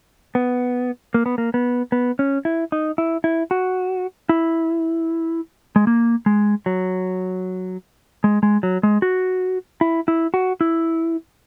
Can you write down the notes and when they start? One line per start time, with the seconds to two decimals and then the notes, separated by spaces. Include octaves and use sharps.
0.35 B3
1.14 A#3
1.26 B3
1.38 A#3
1.54 B3
1.92 B3
2.19 C#4
2.45 E4
2.72 D#4
2.98 E4
3.24 E4
3.51 F#4
4.29 E4
5.76 G#3
5.87 A#3
6.26 G#3
6.66 F#3
8.24 G#3
8.43 G#3
8.63 F#3
8.83 G#3
9.02 F#4
9.81 E4
10.08 E4
10.34 F#4
10.61 E4